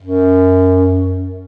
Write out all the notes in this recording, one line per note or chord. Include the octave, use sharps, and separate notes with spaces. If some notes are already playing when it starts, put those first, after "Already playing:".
F#2